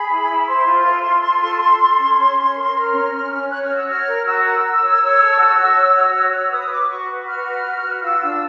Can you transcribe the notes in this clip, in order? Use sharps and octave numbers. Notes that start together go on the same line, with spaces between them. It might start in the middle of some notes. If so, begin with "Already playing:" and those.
Already playing: G#4 B5
E4
E4
C5 C6
F4
A4
F4
F4
A4
A4
A4
C#4
C#4
C#4
A#4
A#4 F6
C#4
C#4
C#4
C#5 F#6
F6
F#4
E6
C#5 F6
A#4
F#4 E6
A#4
A#4
C#5
C#5
A4
F#4
F#4
C#5
F#4
C#5
F#4
B4 D#6
B4 D6
F#4 C#6
B4
F#4 F6
B4
F#4
B4
F4 E6
D4